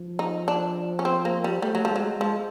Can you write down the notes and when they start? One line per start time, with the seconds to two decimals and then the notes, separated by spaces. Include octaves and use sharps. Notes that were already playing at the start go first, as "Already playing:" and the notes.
Already playing: F3
0.19 D#4
0.48 D4
0.99 C#4
1.05 C4
1.25 A#3
1.44 G3
1.62 G3 A3
1.75 F#3
1.85 F3
1.91 F#3 G#3
2.20 F3 G#3